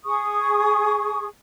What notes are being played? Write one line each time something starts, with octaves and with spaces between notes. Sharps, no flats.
G#4 C#6 D#6